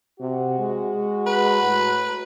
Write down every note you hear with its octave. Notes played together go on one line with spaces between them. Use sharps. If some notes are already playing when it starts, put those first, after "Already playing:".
C3 F#4
G#3
B4
A2